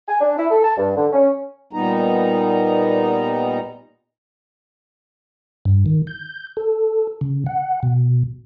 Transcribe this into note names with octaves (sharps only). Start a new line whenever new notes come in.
G#5
D4
E4
A4
A5
G2
D3
C#4
A#2 G3 B3 D#4 A#5
G2
D#3
G6
A4
C#3
F#5
B2